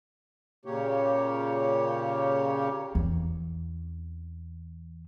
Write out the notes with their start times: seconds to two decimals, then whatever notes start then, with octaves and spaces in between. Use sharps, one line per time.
0.65 A#2 C#3 A#3 G4 C#5
2.95 E2 C4